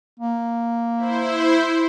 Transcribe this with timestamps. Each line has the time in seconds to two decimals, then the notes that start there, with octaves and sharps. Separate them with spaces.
0.20 A#3
0.97 E4 C5